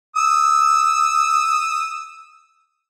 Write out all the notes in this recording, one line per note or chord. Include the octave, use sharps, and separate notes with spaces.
D#6 E6